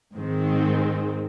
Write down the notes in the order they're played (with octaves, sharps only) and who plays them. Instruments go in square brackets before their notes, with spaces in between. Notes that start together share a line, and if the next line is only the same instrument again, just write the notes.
[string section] G#2 D#3 G#3 C4